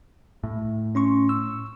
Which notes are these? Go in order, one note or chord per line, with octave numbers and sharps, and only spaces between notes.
A2
C#4 C6 C#6
E6